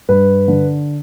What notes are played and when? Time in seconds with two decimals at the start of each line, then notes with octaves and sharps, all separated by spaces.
0.09 G2 B4
0.48 D3